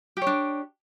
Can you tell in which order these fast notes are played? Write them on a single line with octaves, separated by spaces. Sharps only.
G4 C#5 D4